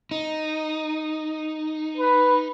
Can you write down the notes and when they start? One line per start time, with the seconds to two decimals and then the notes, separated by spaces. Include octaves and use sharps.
0.11 D#4
1.97 B4